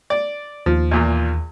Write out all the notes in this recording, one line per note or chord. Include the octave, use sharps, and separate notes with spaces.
D5
D#2 F3
E2 A#2 F4